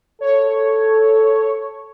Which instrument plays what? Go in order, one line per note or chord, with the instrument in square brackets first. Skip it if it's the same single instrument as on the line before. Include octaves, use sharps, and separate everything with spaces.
[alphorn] A4 [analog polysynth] C#5